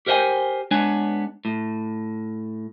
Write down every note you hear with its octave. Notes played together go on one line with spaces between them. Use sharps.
G4 A#4 C5 D#5 G5 G#5
G#3 B3 D4 B4 C#5 G#5
A2